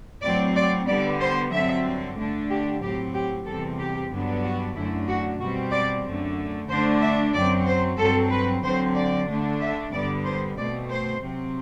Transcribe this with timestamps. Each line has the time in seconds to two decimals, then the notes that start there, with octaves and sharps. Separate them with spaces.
0.23 A2 F#3 C4 D5
0.55 D5
0.88 D3 G3 B3 D5
1.20 C5
1.52 G2 D3 F#3 C4 E5
2.17 D3 A3 D4
2.49 G4
2.82 A2 F#3 C4 G4
3.14 G4
3.46 E2 C3 G3 C4 A4
3.79 G4
4.11 G2 D3 F#3 B3 D4
4.44 F#4
4.75 F#2 D3 A3 D4 E4
5.08 F#4
5.40 B2 G3 C4 F#4
5.72 D5
6.05 F#2 D3 A3
6.69 D3 A3 D4 C5
7.02 E5
7.34 F#2 F#3 C4 D5
7.67 C5
7.98 G2 F#3 C4 A4
8.31 B4
8.63 D3 F#3 C4 C5
8.96 D5
9.28 D3 A3 D4
9.60 E5
9.93 G2 D3 G3 B3 D5
10.25 C5
10.58 B2 A3 C4 D5
10.89 C5
11.22 C3 F#3 C4